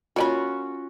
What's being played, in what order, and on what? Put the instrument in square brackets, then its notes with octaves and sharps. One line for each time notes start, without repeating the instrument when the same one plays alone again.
[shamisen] A#3 D5 B5 [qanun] C#4 F4 F#4